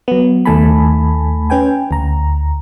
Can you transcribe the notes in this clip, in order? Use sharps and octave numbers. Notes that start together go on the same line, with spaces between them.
F#3 B3
D#2 D#3 A3 G#5 A5 B5
C#4 B4 G5 G#5
D2 A#5